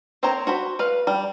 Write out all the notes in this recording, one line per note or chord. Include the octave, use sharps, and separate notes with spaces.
A#3 C4 C5 C#5 A#5
F#4 C5 B5
B4 F5
G3